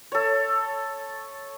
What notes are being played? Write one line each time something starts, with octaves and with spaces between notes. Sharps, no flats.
A4 C#5